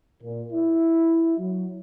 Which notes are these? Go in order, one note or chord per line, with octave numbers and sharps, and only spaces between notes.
A#2
E4
F#3